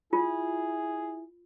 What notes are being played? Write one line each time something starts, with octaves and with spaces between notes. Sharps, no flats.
E4 F4 G#4